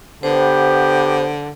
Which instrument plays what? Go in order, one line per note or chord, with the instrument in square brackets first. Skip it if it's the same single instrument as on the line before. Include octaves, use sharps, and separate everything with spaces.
[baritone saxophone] D3 [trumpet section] B3 G4 [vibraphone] C5